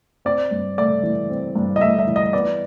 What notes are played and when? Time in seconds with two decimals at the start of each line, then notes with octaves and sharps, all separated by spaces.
0.25 C4 D5
0.51 G2
0.78 A3 D5
1.03 E3
1.30 C4
1.56 G2
1.76 D#5
1.81 A3 E5
1.99 E5
2.07 E3
2.16 D#5
2.33 B3 D5